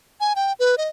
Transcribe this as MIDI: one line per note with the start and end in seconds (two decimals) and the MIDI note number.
0.20 0.33 80
0.36 0.53 79
0.59 0.75 71
0.78 0.88 75